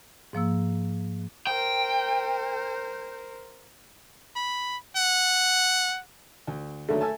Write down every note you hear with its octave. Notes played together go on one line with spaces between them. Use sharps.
G#2 F3 A#3 E6
A#4 C5 G5
B5
F#5
D2
D#2 D3 F#3 A3
E5 G#5 A5